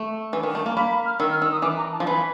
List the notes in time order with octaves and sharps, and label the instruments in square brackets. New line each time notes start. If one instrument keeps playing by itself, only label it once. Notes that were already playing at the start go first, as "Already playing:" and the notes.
Already playing: [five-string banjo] A3
E3
D#3
A3
A#3
[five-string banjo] A#3 [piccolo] B5
[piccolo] B5
F6
[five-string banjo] D#3 [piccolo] E6
[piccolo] F6
[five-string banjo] D#3 [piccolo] E6
[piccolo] D#6
[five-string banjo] E3 [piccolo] D6
[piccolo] A#5
A5
[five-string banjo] F3
[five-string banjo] E3 [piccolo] B5